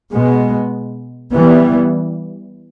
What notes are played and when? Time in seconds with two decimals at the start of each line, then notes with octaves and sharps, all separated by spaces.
0.11 B2 G#3 B3
1.32 E3 G3 B3